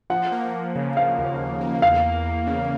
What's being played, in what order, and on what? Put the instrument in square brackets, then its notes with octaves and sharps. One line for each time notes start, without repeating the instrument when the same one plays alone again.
[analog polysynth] F3 [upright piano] F#5
[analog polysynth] A#3
A#3
C#3
[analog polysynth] F3 [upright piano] F5
[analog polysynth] D#2
F3
A#3
[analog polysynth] E2 [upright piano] F5
[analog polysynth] E2
E2
C#3